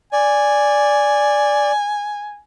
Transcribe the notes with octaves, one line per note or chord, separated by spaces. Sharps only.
D5 G#5